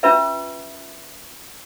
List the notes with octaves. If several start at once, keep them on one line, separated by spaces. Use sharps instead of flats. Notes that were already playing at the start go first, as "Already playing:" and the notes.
C#4 F4 B4 E5